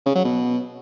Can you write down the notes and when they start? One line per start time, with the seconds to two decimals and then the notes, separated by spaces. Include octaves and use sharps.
0.06 C#3
0.15 F#3
0.24 B2